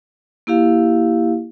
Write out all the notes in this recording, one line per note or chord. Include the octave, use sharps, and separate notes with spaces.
A#3 E4 G4 F5